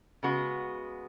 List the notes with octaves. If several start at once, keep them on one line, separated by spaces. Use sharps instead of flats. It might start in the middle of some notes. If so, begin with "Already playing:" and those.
C#3 G#3 B3 F#4